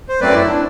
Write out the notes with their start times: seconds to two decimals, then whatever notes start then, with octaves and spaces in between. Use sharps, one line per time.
0.08 C5
0.20 F#2 F#3 A3 C4 B4 D5
0.34 E4
0.47 D4